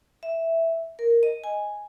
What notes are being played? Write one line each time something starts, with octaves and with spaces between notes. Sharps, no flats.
E5
A#4
D#5
G#5